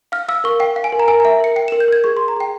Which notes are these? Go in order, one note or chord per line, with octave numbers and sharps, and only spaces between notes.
F5 F6
F5 E6
A#4 C#6
F5 G5
F5
G#5
A#4
A#5
A#4 G#5
A#5
E5
A#4 C#7
G5 C#7
E7
A#4
G6
A#4 G#6
G#4 C#6
C6
G#4
A#5
G#4 G5